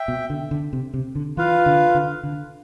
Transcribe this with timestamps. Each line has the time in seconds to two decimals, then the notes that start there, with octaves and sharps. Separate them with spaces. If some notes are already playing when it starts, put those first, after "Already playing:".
Already playing: E5 G5
0.08 B2
0.30 D3
0.51 D3
0.73 C3
0.94 C3
1.15 D3
1.37 E3 F4 B4 F5
1.66 D3
1.95 D3
2.23 D3